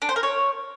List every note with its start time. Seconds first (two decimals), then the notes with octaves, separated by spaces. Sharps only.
0.02 D4
0.09 C5
0.16 A#4
0.23 C#5